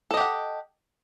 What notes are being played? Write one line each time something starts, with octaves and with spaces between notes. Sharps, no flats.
G4 A4 D#5 F#5